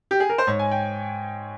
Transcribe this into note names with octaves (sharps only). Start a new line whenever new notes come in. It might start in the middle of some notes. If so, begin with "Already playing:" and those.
G4
G#4
A#4
C5
G#2 C#5
G#5
G5